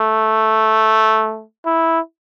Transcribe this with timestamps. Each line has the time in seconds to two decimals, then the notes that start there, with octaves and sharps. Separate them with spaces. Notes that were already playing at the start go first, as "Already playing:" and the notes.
Already playing: A3
1.66 E4